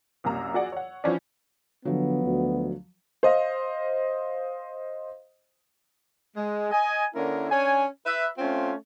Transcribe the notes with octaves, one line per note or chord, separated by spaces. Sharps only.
C2 F#2 C3 A#3 A#5 E6
F#4 G#4 D5 F#5
C#5 F#5
E3 F3 C#4 D4
D3 F3 F#3 B3
D2
C5 D#5 F5
G#3
D#5 G#5
D3 A#3 C#4 E4 A#4
C#4 D4 C#5 G#5
B4 E5
A3 C4 C#4 F4